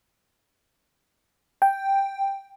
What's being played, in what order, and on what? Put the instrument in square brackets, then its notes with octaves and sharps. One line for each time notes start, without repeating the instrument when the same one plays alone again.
[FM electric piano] G5